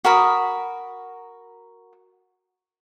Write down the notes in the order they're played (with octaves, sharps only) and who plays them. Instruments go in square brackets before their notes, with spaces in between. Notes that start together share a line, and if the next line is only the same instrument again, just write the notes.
[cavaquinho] F#4 A#4 B5 D#6